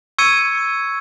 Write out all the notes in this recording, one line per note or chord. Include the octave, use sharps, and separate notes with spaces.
C#6 E6 G#6 C#7 D#7